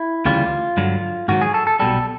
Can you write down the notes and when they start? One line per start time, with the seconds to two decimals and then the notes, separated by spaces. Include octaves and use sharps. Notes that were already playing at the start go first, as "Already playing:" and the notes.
Already playing: E4
0.25 D2 C#3 E3 G3 F4
0.77 G2 D3 F#3
1.28 G#2 D#3 F#3 F#4
1.42 G#4
1.54 A4
1.67 A4
1.80 B1 B2 G3 A4